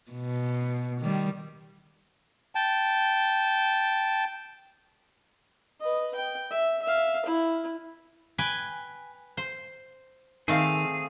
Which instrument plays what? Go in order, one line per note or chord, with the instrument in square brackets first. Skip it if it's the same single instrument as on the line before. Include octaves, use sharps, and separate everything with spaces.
[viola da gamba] B2
D#3 G3
[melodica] G5 A5
[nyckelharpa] B4 D#5
G5
E5
E5 F5
E4
[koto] B4 G5 G#5
C5
[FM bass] D#3 [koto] A3 C4 F5 [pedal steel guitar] G#4